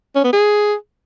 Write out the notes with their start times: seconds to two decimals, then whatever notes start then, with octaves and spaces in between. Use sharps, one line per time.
0.15 C#4
0.24 B3
0.33 G#4